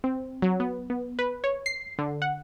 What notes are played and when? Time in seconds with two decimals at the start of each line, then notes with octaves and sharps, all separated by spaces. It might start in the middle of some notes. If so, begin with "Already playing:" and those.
0.04 C4
0.42 F#3
0.60 B3
0.90 B3
1.19 B4
1.44 C#5
1.66 C7
1.99 D3
2.22 F#5